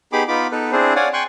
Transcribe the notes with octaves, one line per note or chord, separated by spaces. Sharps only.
B3 D#4 G4 G#4 B5 D6
B3 D#4 F4 B5 D6
B3 D#4 A4 B4
C4 D4 E4 G#4 C5
C#5 D5 F5 F#5 G#5
G5 G#5 C6 C#6 F#6